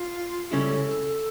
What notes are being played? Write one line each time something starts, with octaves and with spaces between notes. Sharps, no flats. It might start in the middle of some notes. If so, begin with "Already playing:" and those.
Already playing: F4
C#2 C#3 G3 C#4 E4 A4